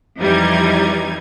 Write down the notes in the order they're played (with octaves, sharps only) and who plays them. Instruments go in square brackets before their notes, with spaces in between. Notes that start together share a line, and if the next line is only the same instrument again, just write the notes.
[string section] F2 E3 G3 D#4 G#6